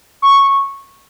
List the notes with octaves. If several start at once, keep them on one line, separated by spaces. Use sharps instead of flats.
C#6